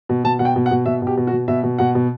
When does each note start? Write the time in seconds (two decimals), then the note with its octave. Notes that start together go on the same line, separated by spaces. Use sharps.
0.09 B2
0.24 B2 A5
0.39 B2 F#5
0.45 G5
0.56 B2
0.66 F#5
0.71 B2
0.86 B2 E5
1.02 B2
1.07 G4
1.17 B2
1.27 F#4
1.32 B2
1.48 B2 E5
1.63 B2
1.78 B2 F#5
1.95 B2